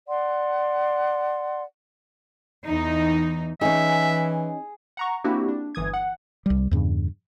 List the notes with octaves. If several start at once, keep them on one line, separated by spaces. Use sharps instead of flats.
D5 F#5 C6
E2 E3 D#4
E3 C#4 D#4 G#4 E5
F#5 A#5 C#6
A#3 C4 D4 E4 F#4 G4
D4
G1 E3 D#6 G#6
F#5
C2 G3
E2 G2 C#3